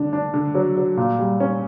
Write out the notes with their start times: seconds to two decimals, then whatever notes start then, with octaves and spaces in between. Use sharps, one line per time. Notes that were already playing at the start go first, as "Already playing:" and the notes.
Already playing: D3 D4
0.13 D4
0.34 D3
0.55 F#3
0.77 F#3
0.97 A#2
1.19 G3
1.40 C#4